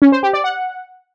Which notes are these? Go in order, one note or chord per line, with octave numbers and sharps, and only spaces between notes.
C#4
C5
G4
D5
F#5